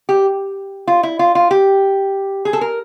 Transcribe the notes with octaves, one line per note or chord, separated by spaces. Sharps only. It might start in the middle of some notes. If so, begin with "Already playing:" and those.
G4
F4
E4
F4
F4
G4
G#4
A4
A#4